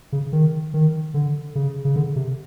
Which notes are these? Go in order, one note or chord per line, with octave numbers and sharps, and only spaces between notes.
C#3
D#3
D#3
D3
C#3
C#3
D3
C3